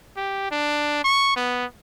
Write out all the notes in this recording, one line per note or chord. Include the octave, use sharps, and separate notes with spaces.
G4
D4
C#6
B3